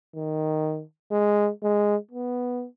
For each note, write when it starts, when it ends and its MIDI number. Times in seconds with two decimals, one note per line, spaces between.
0.16 0.82 51
1.11 1.50 56
1.63 1.96 56
2.11 2.65 59